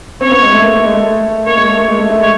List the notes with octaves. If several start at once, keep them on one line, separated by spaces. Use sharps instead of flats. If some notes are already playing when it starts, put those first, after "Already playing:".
C4 C#5
B3
G#3
A3
A#3
A3
G#3
A3
A#3 C#5
G#3
A3
A#3
G#3
A3
A3
G#3
C#5